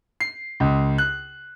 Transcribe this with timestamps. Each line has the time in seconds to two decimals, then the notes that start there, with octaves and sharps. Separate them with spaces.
0.20 C7
0.60 C#2
0.98 F#6